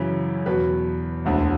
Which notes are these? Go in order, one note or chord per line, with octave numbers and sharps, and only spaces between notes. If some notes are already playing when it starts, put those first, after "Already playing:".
Already playing: F#2 C#3 E3
E2 B2 F#3 B4
E1 D2 D3